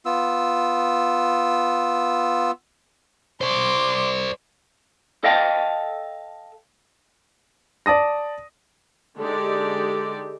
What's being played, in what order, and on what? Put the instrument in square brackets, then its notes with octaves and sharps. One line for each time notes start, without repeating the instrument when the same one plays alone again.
[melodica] B3 F4 E6
[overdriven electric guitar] C5 D5 [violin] C6 D6
[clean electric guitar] A4 D#5 F5 G5 A5
[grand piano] D5 A5 D#6 A#6
[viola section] D3 G#3 D#4 G4 A4 D5